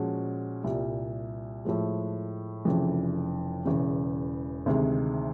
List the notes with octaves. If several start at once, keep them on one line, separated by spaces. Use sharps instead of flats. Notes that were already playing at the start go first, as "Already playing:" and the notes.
Already playing: A#2 F3 G#3 C#4 F#4
C2 A#2 G3
A2 F3 G#3
F1 F2 C#3 E3
E1 E2 C#3
D2 C3 D#3 G#3